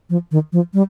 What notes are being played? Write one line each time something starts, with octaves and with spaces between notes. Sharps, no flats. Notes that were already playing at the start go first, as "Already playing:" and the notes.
F3
D#3
F3
G3